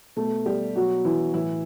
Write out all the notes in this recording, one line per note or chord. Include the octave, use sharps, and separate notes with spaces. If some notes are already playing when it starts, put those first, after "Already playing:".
B2 A3 A4
G3 G4
B2 F#3 F#4
E3 E4
A2 E3 E4